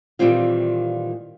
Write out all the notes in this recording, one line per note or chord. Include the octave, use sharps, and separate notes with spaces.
A#2 D#3 E3 G3 C4 F4